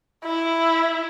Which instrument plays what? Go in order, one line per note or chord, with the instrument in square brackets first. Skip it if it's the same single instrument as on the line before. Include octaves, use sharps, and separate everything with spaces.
[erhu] E4